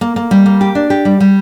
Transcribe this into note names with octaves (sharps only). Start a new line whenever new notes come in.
A#3
A#3
G3
A#3
G4
D4
G4
G3
G3